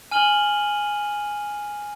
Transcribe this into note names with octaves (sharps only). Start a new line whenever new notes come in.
G#5 F6 D#7 F#7 G7